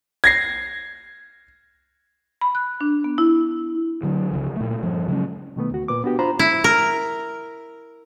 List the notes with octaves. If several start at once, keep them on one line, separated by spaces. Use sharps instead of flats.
G#6 A#6 C7
B5
F#6
D4
B3
E4
D3 F#3 C4
C#2 C#3 F3
A#2 A3
G2 F3
C#3 F#3 G#3 C#4
B2 D#3 A3 B3
D2 F#4
A#2 B4 D6
B3 D4 F#4 G4
D4 F4 C5 A#5 B5
E4
A#4